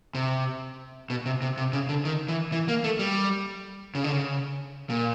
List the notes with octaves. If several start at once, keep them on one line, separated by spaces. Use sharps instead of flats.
C3
B2
C3
C3
C3
C#3
D3
D#3
E3
E3
A#3
A3
G3
C#3
D3
C#3
A#2